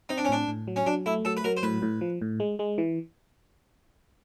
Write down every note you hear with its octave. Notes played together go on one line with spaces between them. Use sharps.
C4 D#4
D4
C#4
A2 D4
A2
F#3
C#4
F#3 D4
A3 E4
F#3 A4
B4
F#3 A#4
C5
A2 B4
A2
F3
A2
G#3
G#3
E3